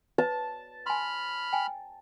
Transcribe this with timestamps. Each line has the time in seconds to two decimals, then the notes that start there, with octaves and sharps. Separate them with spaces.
0.18 B4 A5
0.86 G#5 B5 C6 F6
1.53 G5 G#5